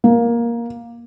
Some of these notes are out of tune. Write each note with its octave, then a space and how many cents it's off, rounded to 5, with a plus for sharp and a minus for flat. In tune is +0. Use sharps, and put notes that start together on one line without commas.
A#3 +10